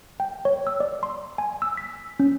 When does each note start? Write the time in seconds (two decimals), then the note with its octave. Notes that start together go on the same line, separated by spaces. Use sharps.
0.20 G5
0.45 C#5
0.67 E6
0.80 D5
1.03 C6
1.38 G#5
1.62 E6
1.77 B6
2.20 C#4